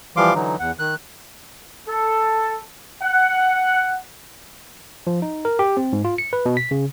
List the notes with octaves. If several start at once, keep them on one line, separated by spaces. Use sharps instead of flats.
E3 F3 G3 F5 C6 D6
D3 E3 F#3 D#4
E2 F#5
D#3 F#6
A4
F#5
F3
D#4
A#4
G4
C4
G#2
F4
C#7
B4
B2
B6
C#3